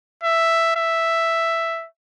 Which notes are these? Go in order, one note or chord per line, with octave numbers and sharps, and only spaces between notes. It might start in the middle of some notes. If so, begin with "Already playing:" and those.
E5
E5